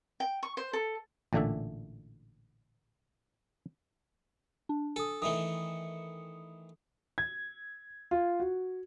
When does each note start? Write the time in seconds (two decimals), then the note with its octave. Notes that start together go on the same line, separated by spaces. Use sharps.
0.20 G5
0.43 C#6
0.57 C5
0.73 A4
1.33 A1 A#2 D3 A3 D4 E5
4.69 D4
4.96 A4 G#5 D#6
5.22 D#3 E3 A3 D#6 C#7
7.18 G#6
8.11 F4
8.40 F#4